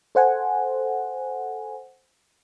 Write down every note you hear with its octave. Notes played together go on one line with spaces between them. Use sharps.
A4 C5 F#5 G#5